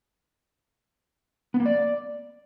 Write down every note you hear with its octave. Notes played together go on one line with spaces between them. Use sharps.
B3
A#3
D5